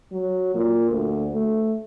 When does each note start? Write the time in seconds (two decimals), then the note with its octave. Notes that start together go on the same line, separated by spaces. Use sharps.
0.12 F#3
0.55 A#2
0.89 D2
1.34 A3